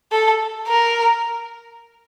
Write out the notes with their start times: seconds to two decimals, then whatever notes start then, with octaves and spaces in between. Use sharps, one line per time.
0.12 A4
0.68 A#4